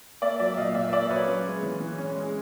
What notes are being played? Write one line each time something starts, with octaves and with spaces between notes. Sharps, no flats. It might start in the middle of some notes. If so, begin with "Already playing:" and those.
A#3 D5 E5
F#3 D5 E5
A#2 D#5 F5
A#2 D5 E5
A#3 D5 E5
F#3 B4 C#5
C#4
G#3
E3
E3
C#4
G#3